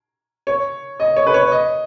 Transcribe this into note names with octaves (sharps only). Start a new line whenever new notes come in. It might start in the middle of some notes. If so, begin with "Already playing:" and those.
C#5
D#5
C#5
B4
C#5
D#5